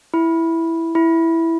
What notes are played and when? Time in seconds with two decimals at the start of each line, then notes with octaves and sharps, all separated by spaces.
0.14 E4
0.95 E4